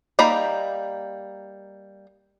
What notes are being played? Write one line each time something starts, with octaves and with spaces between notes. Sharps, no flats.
G3 A#3 D#4 A#5 B5